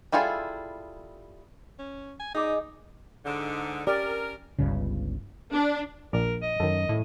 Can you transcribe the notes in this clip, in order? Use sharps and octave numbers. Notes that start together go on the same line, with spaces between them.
G3 E4 F4 G#4 A4
C#4
G#5
D#4 G#4 D5 D#5
G#2 D3
C#4 G4 A#4 D5
G1 C#2 G2 C#3
D4
A#1 A#4 D5
D#5
F#2 D#3 A4
A2